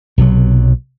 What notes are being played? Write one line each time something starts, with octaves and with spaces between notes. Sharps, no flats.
B1 C3 D#3 F#3